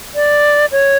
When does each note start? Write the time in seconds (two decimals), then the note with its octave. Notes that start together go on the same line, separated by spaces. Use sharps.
0.15 D5
0.72 C#5